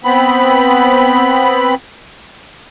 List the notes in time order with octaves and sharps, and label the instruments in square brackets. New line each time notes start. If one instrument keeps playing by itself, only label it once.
[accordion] B3 C4 B5